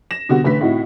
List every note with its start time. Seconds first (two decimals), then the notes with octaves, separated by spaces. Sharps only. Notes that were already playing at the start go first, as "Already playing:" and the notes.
0.11 A#6 E7
0.29 B2 D3 G3 F#4
0.44 A1 D3 A3 B4 B6
0.61 A2 C3 D#4 E4 F#4